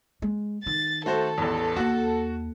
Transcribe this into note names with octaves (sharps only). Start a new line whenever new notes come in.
G#3
D#3 A6
A3 F#4 A4 C5
A1 E2
D#2 F#4 F#5